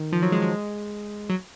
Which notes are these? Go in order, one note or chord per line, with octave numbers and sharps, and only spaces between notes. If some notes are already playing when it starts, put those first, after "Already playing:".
Already playing: D#3
F3
F#3
G#3
G#3
F#3